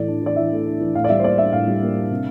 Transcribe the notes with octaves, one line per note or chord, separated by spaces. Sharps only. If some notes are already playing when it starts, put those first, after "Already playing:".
Already playing: A2 E3 A3 D5
D4
E3 D5
E3 E5
A3
D4
E3
A2 F5
D5
G3 E5
C5
A#3 D5
D4 E5
A2 F5
G3
A#3
D4
C3